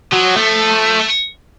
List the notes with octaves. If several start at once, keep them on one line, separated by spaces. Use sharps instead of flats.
F3 F#3
A3
A3